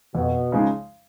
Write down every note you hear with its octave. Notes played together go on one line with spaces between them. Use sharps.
F2 B2
C#3 F3 G#3 D#4